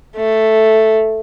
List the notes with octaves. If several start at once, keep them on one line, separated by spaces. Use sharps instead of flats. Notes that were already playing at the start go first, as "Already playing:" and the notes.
A3